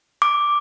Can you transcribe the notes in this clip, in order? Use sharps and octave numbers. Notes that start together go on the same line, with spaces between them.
D6